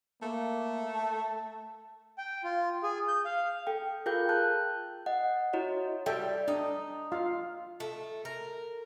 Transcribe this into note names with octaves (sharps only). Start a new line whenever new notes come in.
A3 A#3
A5
G5
F4
G#4
G6
F5
A4 G5
F4 G#4 A#4 F5 G5 G6
A5 F#6 G6
D#5 F#5
E4 F#4 C#5 D#5
G3 A4 E5 G5
D4 D#4
F4 F5
A3
A#4